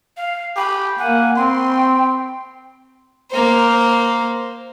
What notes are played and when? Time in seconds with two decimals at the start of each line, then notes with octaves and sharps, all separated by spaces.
0.17 F5
0.57 G4 B5
0.99 A#3 F#5 G#5
1.37 C4 G5 C6
3.31 A#3 C5